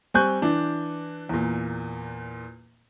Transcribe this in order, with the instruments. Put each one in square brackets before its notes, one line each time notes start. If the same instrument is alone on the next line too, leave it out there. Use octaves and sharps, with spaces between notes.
[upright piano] G3 C4 G#5 C#6 F#6 G6
E3 D4
E2 A#2